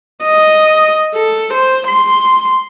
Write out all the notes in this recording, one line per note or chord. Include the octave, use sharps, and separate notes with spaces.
D#5
A4
C5
C6